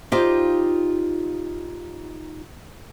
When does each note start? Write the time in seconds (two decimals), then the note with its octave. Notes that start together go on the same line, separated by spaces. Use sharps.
0.12 D#4 F4 G4 C5 D5 F5